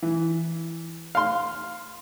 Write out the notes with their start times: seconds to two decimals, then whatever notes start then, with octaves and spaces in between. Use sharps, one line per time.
0.02 E3
1.15 F5 C6